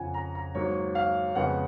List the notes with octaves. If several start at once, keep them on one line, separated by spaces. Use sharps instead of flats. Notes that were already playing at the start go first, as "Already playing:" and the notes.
Already playing: F2 C#3 F3 F#5 G#5
A#5
A#5
G#2 F#3 A#3 C#5
F5
F2 C#3 G#3 B3 F#5